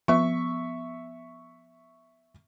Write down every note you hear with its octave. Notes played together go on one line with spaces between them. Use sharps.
F3 B3 E5 C#6